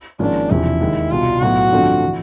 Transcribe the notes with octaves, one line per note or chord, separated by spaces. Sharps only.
G#1 G#2 F3 A#3 C#4 D4
E1 E2 C3 F3 E4
D#2 D#3 G#3
C2 B2 G3 F4
B1 A2 F#3 B3 F#4
G2 D3 F3 A3 C4
E3